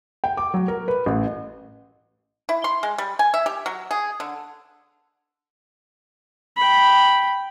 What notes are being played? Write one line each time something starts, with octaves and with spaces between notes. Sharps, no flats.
G5
D6
F#3
A#4
B4
A1
E4
C6
G#3
G3
G#5
E5
G4
F#3
G#4
D3
G5 B5